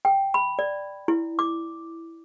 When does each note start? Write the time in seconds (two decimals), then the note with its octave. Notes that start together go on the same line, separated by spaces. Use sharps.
0.05 G5
0.34 B5
0.59 D5
1.08 E4
1.39 D6